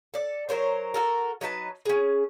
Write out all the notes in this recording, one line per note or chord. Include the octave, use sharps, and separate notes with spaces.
A4 D5
F#3 A#4 C5 C#5
F#4 A4 A#4
F#3 D#4 B4 A5
C#4 G#4